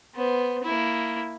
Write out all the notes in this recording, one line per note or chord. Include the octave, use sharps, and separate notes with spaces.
B3 C5
A#3 E4